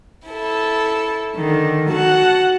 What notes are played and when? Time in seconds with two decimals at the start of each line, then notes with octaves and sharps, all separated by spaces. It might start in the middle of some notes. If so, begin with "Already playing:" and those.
0.25 E4 A4
1.36 D3 D#3
1.91 F#4 F#5 A5